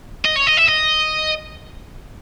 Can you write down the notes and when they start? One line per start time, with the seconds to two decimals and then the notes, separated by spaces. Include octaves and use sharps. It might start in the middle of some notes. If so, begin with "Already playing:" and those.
0.25 D#5
0.36 C#5
0.47 D#5
0.57 E5
0.68 D#5